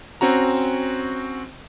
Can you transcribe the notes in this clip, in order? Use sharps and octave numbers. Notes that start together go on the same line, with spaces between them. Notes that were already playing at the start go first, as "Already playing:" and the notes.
C4 C#4 F#4 A#5